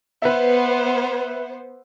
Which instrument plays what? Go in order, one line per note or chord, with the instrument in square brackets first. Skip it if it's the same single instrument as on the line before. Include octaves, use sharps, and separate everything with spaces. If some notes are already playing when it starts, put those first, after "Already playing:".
[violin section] B3 C5 [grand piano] B4 E5